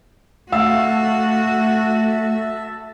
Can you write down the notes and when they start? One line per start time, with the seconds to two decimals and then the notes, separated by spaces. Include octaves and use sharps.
0.52 A3 F#4 E5 F5 A5 E6